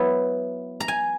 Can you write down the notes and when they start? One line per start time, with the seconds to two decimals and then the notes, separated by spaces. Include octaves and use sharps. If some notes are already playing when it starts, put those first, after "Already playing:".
Already playing: F#3 B3 E4 B4
0.80 A#5
0.88 G#5